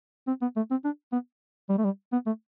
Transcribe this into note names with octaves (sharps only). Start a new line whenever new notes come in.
C4
B3
A3
C4
D4
B3
G3
A3
G3
B3
A3